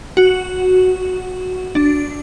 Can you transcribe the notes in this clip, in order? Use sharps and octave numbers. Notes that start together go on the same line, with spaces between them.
F#4
D4